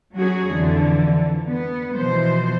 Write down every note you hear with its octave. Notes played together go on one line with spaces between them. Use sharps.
F#3 C#4 F#4 G#4
F2 D3 E3
B3
B2 E3 F3 C5